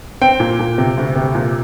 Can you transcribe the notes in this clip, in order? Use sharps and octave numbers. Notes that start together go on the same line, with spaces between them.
C4 G5
A#2
A#2
C3
D2
C3
A#2